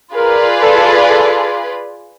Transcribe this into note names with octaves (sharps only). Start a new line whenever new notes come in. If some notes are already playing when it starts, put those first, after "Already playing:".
F4 G#4 A#4 B4 D5
A4
A4